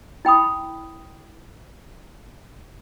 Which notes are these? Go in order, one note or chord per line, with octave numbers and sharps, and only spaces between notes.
E4 G5 B5 D#6